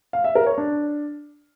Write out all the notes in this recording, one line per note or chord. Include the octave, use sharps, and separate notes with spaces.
F5
E5
A#4
C#5
D4